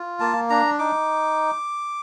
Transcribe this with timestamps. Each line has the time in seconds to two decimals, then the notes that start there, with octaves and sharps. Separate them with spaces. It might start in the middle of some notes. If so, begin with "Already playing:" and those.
Already playing: F4
0.20 A#3 A5
0.50 D4 A#5
0.79 D#4 D6